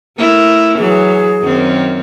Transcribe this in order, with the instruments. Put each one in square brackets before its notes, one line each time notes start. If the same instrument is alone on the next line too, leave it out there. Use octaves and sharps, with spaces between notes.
[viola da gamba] A3 E4 A#4
[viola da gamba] E3 F#3 [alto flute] G#4
[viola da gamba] F#2 D#3 C4